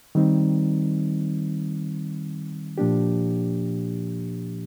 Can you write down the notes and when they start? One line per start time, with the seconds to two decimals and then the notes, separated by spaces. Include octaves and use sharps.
0.15 D#3 G3 C4 D#4
2.78 A#2 F3 A#3 D4 G4